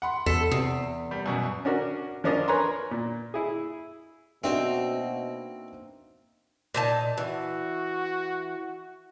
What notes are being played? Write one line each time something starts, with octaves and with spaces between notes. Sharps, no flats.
F#5 B5 C6
E2 A4 B6
E2 C3 D#6 C7
G3
F#2 B2
C#4 D4 F#4 A#4
F3 C#4 D4 F4 A#4 D#5
A#4 B4 C#5 G#5 A#5 C6
A#2
E4 G#4
B2 A#3 C4 D4 D#4 F#4 E5
A#2 D#4 A5
E3 F#4